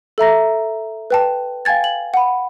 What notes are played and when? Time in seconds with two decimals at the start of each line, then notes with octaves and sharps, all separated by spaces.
0.18 A4 E5 A#5 A#6
1.10 B4 G5 A5
1.65 F5 G5 G#5 G#6 A6
1.84 F#7
2.14 F#5 B5